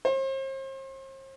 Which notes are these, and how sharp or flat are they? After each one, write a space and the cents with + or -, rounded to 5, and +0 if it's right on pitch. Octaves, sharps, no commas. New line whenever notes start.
C5 +40